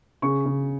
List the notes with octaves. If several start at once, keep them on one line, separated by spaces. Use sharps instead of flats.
C#3 C#6
C#3